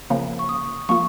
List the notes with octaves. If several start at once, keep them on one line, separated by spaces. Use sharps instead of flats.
C#3 F3 A#3
C#6
D#6
F3 A#3 F4 C#6